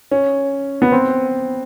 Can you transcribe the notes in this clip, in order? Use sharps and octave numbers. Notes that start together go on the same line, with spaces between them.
C#4
B3
C4